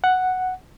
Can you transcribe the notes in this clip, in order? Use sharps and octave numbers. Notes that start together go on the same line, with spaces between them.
F#5